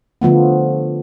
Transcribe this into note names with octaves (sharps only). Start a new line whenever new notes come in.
D3 F3 A3 B3